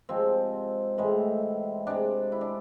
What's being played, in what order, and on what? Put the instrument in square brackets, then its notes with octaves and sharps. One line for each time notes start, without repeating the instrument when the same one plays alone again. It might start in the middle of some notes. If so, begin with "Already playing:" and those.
[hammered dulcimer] C3 F3 G#3 C4
A2 E3 G#3
C3 G#3 D4
E4
D4